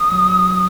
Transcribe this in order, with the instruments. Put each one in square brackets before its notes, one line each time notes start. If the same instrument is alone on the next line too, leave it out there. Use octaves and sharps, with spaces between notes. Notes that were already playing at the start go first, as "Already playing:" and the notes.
Already playing: [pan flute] D#6
[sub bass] F#3